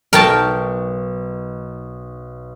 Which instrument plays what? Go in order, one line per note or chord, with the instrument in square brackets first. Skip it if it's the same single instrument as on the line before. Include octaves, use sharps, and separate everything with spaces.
[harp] B1 C#6 [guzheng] A#4 G5 A5